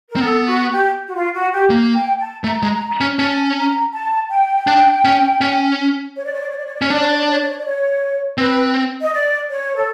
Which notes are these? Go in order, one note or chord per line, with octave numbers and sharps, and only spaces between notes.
A#4
C4
B3 A4
F#4
G4
F#4
F4
F#4
G4
A#3
G5
A5
A3 A#5
G#3
C#4
C#4 A5
A#5
A5
G5
D4
C#4
C#4
C#5
D5
C#5
D5
C#5
D5
C#5
D5
C#4 C#5
D4 D5
C#5
D5
C#5
D5
C#5
D5
C#5
D5
C#5
C4 B4
D#5
D5
C#5
A4